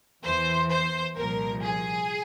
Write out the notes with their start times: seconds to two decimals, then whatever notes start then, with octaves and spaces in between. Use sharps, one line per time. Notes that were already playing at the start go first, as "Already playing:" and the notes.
0.24 E2 E3 C5
0.70 C5
1.16 C2 A#2 F3 A#4
1.63 G#4